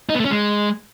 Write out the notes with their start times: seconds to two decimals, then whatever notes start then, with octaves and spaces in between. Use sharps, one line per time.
0.09 D#4
0.15 B3
0.20 A3
0.25 C#4
0.31 G#3